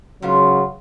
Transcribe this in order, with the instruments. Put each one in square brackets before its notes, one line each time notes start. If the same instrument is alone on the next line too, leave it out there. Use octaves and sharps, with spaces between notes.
[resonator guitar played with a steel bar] G#2 B3 F4 [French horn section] C#3 F#3